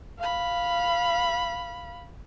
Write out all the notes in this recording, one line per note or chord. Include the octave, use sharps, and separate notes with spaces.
F5 B5